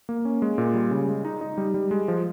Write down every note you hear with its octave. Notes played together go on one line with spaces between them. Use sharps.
A#3
C#4
G#3
A#2
G3
C#3
G#3
D#4
D#4
G3
G3
G#3
F3